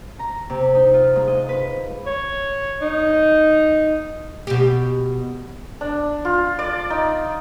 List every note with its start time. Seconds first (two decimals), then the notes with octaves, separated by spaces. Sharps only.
0.19 A#5
0.50 C3
0.75 D#4
0.93 F4
1.16 G#2
1.27 D#5
1.49 B4
2.06 C#5
2.82 D#4
4.47 B2 G4
5.81 D4
6.25 F4
6.59 D5
6.90 D#4